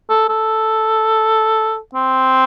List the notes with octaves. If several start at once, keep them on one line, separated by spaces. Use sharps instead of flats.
A4
A4
C4